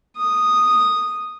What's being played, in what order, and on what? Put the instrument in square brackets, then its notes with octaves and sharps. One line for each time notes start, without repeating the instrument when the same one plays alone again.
[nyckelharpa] D#6